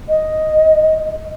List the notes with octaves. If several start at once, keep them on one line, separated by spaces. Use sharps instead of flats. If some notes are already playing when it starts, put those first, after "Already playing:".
D#5